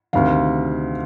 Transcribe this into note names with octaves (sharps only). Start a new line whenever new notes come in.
D2 C3 D#3 F5